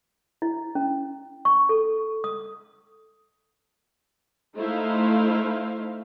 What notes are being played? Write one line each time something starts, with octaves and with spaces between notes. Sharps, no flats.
E4
C#4
C#6
A4
D#6
A3 D#4 E4 C5 F5